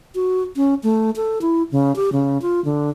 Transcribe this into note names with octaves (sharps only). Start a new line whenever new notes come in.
F#4
C#4
A3
A4
E4
C#3
G4
C#3
F4
D3